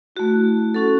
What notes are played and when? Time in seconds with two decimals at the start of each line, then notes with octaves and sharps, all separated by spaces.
0.16 A3 E4 F#4
0.74 F#3 C#4 F#4 A4